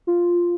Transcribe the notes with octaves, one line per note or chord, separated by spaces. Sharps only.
F4